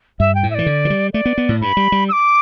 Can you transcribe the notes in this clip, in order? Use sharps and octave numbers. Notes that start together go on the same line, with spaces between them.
G2 E5
G5
A2
E5
E3 D5
D3
E3
G3
A3 D5
B3
B3
A2
G2 B5
G3
G3
E6
D6